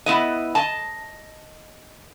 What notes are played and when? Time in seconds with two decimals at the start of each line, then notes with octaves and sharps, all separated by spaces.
0.06 B3 E4 D#5
0.55 D#5 A5